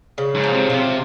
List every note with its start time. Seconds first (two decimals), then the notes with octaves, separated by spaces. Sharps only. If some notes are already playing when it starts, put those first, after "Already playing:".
0.18 C#3
0.35 G#2
0.44 F3
0.53 C3
0.70 C3 F4